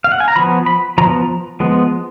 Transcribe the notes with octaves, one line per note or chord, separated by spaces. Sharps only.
F5
F#5
G#5
A#5
F3 B3 B5
B5
F3 B3 A#5
F3 G#3 B3